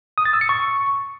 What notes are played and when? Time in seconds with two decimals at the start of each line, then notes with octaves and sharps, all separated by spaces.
0.18 D#6
0.25 A6
0.33 E6
0.41 C#7
0.49 C#6